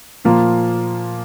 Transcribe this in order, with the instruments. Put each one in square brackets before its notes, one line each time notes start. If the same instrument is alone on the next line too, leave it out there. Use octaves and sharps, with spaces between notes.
[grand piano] A#2 F3 A#3 F4